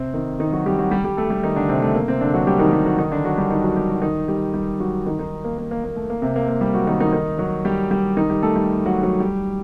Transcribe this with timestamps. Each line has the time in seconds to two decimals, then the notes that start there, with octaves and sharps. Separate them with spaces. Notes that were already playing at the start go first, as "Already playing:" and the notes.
Already playing: C3 C4
0.14 D#3 D#4
0.40 D#3 D#4
0.53 F#3 F#4
0.66 G3 G4
0.79 F#3 F#4
0.91 G3 G4
1.04 G3 G4
1.17 A3 A4
1.30 G3 G4
1.43 D#3 D#4
1.56 D3 D4
1.69 C3 C4
1.82 A3
1.95 A#3
2.08 C3 C4
2.21 D3 D4
2.34 F#3 F#4
2.47 G3 G4
2.59 D#3 D#4
2.73 G3 G4
2.86 F#3 F#4
2.98 D#3 D#4
3.11 D3 D4
3.25 F#3 F#4
3.37 G3 G4
3.50 D#3 D#4
3.63 F#3 F#4
3.76 G3 G4
3.89 F#3 F#4
4.02 D#3 D#4
4.28 G3 G4
4.54 G3 G4
4.80 F#3 F#4
5.06 D#3 D#4
5.19 D#3 D#4
5.44 A#3
5.58 A#3
5.71 A#3
5.84 A#3
5.96 A3
6.10 A#3
6.22 C3 C4
6.36 A#3
6.48 A#3
6.61 G3 G4
6.74 F#3 F#4
6.87 D#3 D#4
7.00 D#3 D#4
7.13 D#3 D#4
7.39 F#3 F#4
7.65 G3 G4
7.91 G3 G4
8.17 D#3 D#4
8.30 G3 G4
8.43 A3 A4
8.56 G3 G4
8.86 F#3 F#4
9.03 F#3 F#4
9.20 G3 G4